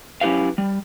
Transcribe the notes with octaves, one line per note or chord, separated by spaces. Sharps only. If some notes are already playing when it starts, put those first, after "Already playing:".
F#3 C#4 E4 G4 B4 F5
G3